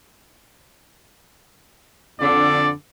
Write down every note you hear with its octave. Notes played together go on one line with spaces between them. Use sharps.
F2 D3 D5